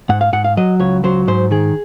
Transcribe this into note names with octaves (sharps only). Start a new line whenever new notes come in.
G#2 F#5
F5
G#2 F#5
F5
F#3 D#5
C#2 C#5
F#3 C5
G#2 C5
D#3 G#4